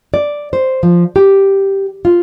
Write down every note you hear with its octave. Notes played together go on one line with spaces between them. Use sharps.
D5
C5
F3
G4
F4